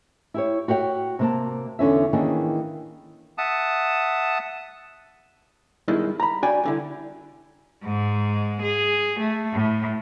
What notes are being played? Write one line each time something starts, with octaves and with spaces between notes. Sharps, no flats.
E4 G4 C#5
F#4 G4 C#5 F#5 G5
C3 A#3 A5
E2 D3 C#4 E5
D#3 E3 A#3 C#4 D4 G#4
E5 F#5 A5 D#6
G2 B2 D#3 G#3 E4
A#5 B5
D4 F#4 D5 G5 G#5
C2 D3 E4
G#2 G#3
G#4
A3
A2